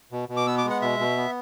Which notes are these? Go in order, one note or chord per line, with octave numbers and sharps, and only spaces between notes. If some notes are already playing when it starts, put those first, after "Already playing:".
B2
B2
D6
B3 E6
D6
G#3
F#5
B2 E5
B2
B3